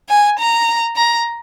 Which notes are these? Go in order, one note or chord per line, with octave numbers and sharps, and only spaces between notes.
G#5
A#5
A#5